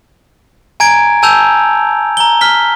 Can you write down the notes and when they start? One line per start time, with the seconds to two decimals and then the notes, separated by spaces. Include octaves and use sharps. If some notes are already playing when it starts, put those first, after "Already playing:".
0.80 G#5 A#5 G#6 D7
1.23 G#5 A5 E6 G6 F7
2.17 A#5 G7
2.41 F6 B6 G7